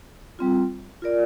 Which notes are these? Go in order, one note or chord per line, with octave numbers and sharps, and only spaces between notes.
G3 C4 F4
F4 A#4 D5